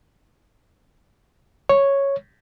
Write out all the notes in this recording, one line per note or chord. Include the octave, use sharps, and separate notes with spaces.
C#5